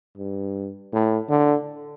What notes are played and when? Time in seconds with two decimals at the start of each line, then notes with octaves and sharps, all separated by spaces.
0.18 G2
0.93 A2
1.30 D3